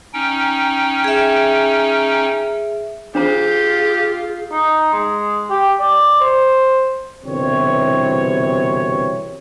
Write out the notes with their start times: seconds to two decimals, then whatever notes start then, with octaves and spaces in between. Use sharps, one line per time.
0.14 C#4 D#4 G5
1.04 G#4 E5
3.15 D4 F4 G4 G#4 C5 A#5
4.51 D#4
4.93 G#3
5.50 G4
5.79 D5
6.20 C5
7.25 G1 C2 B2 E3 C4 C#5